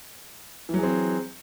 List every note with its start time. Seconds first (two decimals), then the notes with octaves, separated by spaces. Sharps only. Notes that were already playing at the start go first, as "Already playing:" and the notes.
0.69 E3
0.74 F#3
0.79 G#4
0.83 C4